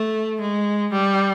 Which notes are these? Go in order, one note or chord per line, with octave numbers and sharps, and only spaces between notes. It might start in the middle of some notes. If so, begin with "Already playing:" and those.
Already playing: A3
G#3
G3